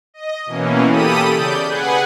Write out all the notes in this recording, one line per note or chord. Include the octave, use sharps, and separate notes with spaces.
D#5
B2 E3 A#3 C#4
G4 A4 B5 D#6 D#7
C#3 D5 G6
G#4 B4 F#5 G#5